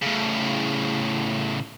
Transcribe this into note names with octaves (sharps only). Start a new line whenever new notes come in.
A2 C#3